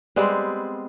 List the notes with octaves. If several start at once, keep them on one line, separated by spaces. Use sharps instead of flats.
G3 G#3 B3 C4